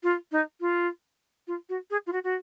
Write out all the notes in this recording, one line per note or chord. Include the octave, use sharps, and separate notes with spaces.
F4
D#4
F4
F4
F#4
G#4
F4
F#4
F#4